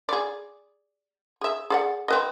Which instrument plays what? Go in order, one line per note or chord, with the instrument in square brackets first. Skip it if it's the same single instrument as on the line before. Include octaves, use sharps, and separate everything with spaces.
[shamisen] G#4 D5
G#4 E5
G#4 D5 F#5
C4 B4 D#5